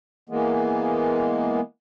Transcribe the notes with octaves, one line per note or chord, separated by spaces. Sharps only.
E3 G#3 A#3 B3